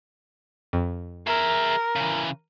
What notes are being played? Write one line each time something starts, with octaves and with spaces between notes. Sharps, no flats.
F2
G#4 A#4 E5
C#3 E3